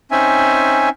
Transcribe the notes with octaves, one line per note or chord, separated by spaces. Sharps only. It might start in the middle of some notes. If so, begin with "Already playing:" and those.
C4 C#4 D#4 E5 G#5